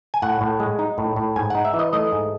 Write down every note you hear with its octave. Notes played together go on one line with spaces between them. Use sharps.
G#5
A2 F#5
A2
G#3
D#4
A2
A2
G#2 G#5
D#4 F#5
E5
E3
D#5
A3 D#5
G#2